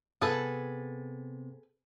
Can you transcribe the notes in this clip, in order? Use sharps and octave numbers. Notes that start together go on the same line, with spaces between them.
C3 B3 G#4 A4 B4 G#5